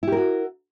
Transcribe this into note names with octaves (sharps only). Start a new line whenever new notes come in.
E4 F#4 G4 A#4